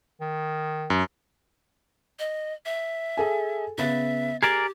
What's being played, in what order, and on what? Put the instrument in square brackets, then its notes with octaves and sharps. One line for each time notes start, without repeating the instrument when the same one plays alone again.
[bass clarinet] D#3
[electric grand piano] F#2
[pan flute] D#5
E5
[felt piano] G#4 A4 G#5
[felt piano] C#3 B3 A6 [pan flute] E5
[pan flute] G4 [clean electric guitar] G#4 A#4 D5 [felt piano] G#6